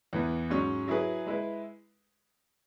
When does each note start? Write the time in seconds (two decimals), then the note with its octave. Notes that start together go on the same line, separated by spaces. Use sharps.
0.13 E2 E3 B3
0.50 G#2 F#3 C#4
0.88 F#3 E4 G#4 B4
1.27 G#3 E4 B4